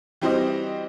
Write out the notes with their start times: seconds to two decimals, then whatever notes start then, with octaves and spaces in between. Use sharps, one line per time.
0.21 E3 G3 C4 F#4 C5 D#5